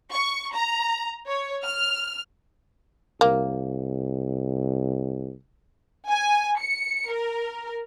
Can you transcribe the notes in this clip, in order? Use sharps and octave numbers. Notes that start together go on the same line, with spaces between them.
C#6
A#5
C#5
F6
C2 A#3
G#5
C#7
A#4